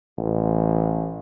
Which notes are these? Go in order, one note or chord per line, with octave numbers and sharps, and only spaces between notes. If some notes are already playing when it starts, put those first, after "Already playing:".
A1